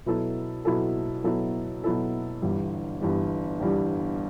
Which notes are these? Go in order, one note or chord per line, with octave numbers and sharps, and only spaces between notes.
B2 F#3 B3 E4 A4
B2 F#3 B3 E4 A4
B2 F#3 B3 E4 A4
B2 F#3 B3 E4 A4
G1 G2 E3 G3
G1 G2 E3 G3
G1 G2 E3 G3